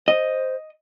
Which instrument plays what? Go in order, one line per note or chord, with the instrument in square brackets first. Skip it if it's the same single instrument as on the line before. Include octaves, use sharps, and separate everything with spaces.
[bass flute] C5 [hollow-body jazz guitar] D#5